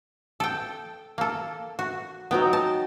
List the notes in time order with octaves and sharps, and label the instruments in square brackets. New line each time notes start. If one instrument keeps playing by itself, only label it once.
[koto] A4 G5
A#3 A4
F#4
[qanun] F#3 D#4 G5 [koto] B3
[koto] A5